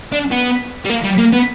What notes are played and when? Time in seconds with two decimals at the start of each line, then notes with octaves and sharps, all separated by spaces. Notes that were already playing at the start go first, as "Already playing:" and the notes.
0.12 D4
0.31 B3
0.85 G3
0.90 A#3
1.04 G3
1.19 A#3
1.33 B3